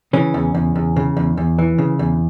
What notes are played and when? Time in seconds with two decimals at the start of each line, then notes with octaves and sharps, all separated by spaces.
0.13 C#3 E3 C#4
0.34 E2
0.55 E2
0.76 E2
0.96 C#3
1.17 E2
1.37 E2
1.59 E3
1.78 C#3
1.99 E2